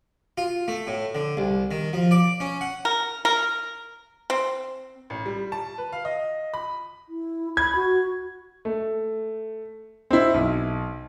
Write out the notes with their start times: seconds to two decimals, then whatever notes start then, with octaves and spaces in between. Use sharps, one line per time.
0.38 F4
0.68 A3
0.87 A2
1.15 D3
1.37 C2
1.71 D#3
1.93 F3
2.11 D5
2.40 C#4
2.61 F#5
2.85 A#4
3.25 A#4
4.30 C4
5.10 A1
5.26 G3
5.52 A5
5.78 B4
5.92 F5
6.05 D#5
6.54 B5
7.09 E4
7.57 B5 G#6
7.75 F#4
8.65 A3
10.11 C4 E4
10.34 B1